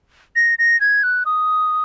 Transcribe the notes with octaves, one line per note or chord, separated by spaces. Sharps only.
A#6
A#6
G#6
F#6
D#6